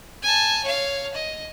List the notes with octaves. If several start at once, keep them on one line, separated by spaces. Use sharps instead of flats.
G#5 A5
C#5 F5
D#5